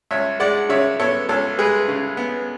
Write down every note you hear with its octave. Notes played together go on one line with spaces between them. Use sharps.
C#2 C#5 E5
G#3 D5 F#5
C#3 C#5 E5
B3 A4 C#5
C#2 A4 C#5
G#3 G#4 B4
C#3
B3